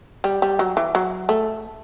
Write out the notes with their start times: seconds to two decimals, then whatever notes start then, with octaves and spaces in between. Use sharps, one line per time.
0.24 G3
0.42 G3
0.59 F#3
0.77 E3
0.95 F#3
1.29 A3